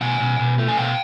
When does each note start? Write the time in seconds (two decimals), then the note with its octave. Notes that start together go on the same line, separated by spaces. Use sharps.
0.01 B2 F#5 G#5
0.20 B2
0.39 B2
0.58 A3
0.68 G#5
0.77 B2 F5 G5